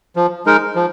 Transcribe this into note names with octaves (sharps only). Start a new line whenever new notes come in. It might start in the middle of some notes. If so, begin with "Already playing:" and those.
F3
G#3 D#4 A#4
F3